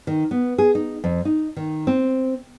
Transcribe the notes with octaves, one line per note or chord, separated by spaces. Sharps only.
D#3
B3
G#4
D#4
F2
D#4
D#3
C4